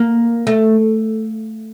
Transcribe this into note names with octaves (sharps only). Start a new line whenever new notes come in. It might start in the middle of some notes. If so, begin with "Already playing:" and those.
Already playing: A#3
A3